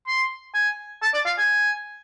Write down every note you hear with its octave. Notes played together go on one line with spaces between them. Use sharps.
C6
G#5
A5
D5
F5
G#5